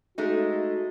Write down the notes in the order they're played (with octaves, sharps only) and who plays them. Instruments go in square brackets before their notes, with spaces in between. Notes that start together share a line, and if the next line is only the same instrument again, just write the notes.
[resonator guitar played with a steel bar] G#3 A3 D#4 [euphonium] F#4